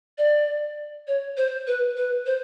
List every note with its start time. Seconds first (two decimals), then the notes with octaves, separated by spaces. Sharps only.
0.18 D5
1.08 C#5
1.37 C5
1.67 B4
1.97 B4
2.26 C5